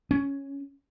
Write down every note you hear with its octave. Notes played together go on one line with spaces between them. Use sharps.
C#4